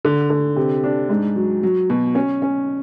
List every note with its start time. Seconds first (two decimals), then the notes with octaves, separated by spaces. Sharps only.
0.05 D3
0.30 D3
0.56 C3
0.84 D4
1.10 G#2
1.36 F#3
1.63 F#3
1.90 B2
2.15 C#4
2.42 C#4